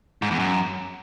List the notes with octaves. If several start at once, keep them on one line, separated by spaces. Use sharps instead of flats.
G#2
E2
F#2